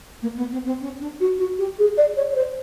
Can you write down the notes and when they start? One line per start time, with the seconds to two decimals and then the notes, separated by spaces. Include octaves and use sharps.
0.22 A#3
0.37 B3
0.52 C4
0.65 C4
0.81 C#4
1.00 D4
1.20 F#4
1.38 F#4
1.58 G4
1.78 G#4
1.97 D5
2.16 C#5
2.31 C#5
2.35 C5